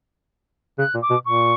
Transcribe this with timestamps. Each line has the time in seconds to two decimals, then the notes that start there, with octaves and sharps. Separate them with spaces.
0.78 C#3 F#6
0.94 A#2
1.02 D6
1.10 B2
1.25 A#2 C#6